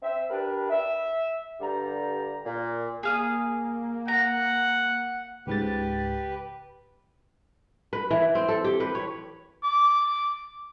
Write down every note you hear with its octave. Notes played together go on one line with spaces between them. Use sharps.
C4 E5
D4 G4 A#4 B4
E5
G2 D3 G3 A#5
A#2
A#3 G#4 F5 D#6
F#5 A#5
C#2 G#2 G4 B4 A6
B4
E3
C4
A4
G4
B4
C#5
D6